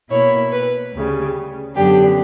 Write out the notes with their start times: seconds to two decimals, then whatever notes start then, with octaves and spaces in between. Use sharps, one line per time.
0.10 B2 A#3 E4 C#5
0.52 B4
0.93 D2 C#3 G3
1.76 F#2 D3 F#3 B3 D4 G4